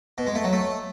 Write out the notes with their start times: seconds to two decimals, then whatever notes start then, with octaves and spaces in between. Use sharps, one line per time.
0.18 B2
0.27 G#3
0.35 A3
0.44 F#3
0.53 A3